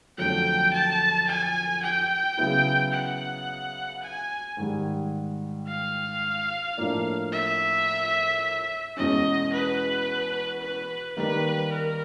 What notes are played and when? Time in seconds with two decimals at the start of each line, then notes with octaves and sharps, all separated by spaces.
0.18 F2 D3 F#3 A3 C4 G5
0.73 A5
1.27 G#5
1.83 G5
2.37 C#3 F#3 B3 E4
2.93 F#5
4.02 G#5
4.57 G#2 D#3 G3
5.67 F5
6.77 A2 F3 A#3 D4
7.32 E5
8.97 E2 B2 G#3 C#4 D#5
9.52 B4
10.62 B4
11.17 D#3 G3 A#3 D#4 B4
11.72 A#4